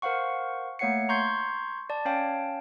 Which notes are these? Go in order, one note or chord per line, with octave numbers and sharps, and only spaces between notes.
A#4 C5 F5 F#5 C#6
A3 A#3 C#5 F#5 C7 C#7
A#5 C6 C#6 G6 G#6 C7
D5 A5
C#4 C#5 F5 G5 A5